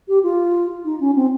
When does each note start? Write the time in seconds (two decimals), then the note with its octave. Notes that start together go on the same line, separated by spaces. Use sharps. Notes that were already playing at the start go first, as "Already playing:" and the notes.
0.08 G4
0.23 F4
0.85 D#4
1.00 C#4
1.16 C4